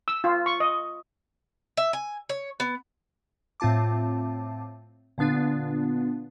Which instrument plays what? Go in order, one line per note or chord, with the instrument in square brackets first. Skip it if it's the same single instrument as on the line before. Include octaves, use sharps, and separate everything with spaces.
[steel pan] E6
F4
C#6
D#5
[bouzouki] E5
G#5
C#5
B3
[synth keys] A2 C4 F4 A5 D6
A#2 D3 B3 D4 F4